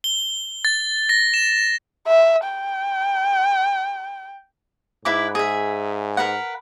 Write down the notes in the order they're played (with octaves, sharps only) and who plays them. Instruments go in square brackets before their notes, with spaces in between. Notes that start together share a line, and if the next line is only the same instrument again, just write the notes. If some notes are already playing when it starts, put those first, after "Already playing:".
[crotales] G7
A6
A#6
E7
[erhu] E5
G5
[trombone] G#2 [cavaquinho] E4 B4 D6
[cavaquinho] G#4 E5
A#4 B4 F#5